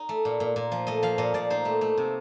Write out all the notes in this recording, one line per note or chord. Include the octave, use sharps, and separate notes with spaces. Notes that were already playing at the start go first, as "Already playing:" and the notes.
Already playing: D#4
A3
A#2
A#2
A#2
F3
A3 D#5
F3 F5
A#2 D#5
A#2 D5
D#4 C5
A3
A3
C3